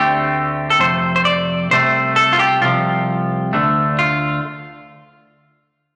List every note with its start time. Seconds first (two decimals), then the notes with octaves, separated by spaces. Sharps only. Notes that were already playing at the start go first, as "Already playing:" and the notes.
Already playing: D2 D3 A3 C4 G4
0.70 A4
0.79 F2 C3 A3 C5
1.16 C5
1.25 D5
1.71 C2 C3 A3 C5
2.16 A4
2.33 F4
2.39 G4
2.61 C2 C3 F3 F4
3.53 D2 D3 A3 D4
3.99 F4